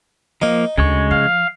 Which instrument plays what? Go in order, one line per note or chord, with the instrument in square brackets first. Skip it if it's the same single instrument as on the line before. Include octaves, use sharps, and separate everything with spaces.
[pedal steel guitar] F3 A#3 [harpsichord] D#4
[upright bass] D2 [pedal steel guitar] C#3 G#3 C#6
[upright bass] F3 [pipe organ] F5